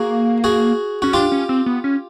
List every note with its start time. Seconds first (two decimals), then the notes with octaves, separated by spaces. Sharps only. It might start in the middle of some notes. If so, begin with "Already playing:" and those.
Already playing: A#3 F#4 G#4
0.44 F#4 G#4
1.02 C#4 F#4
1.13 D4 F4 G4
1.32 C#4
1.49 C4
1.66 B3
1.84 C#4